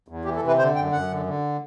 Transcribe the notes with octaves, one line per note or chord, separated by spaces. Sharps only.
E2
E3 G4
A4
C3
B4
D3 C5
F#2 G5
F#2 F#5
D3
D3